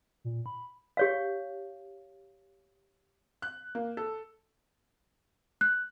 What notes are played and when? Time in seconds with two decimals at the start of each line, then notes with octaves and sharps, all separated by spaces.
0.24 A#2
0.46 B5
0.97 G4 C#5 F5
3.42 F#6
3.75 A#3
3.97 A4
5.61 F#6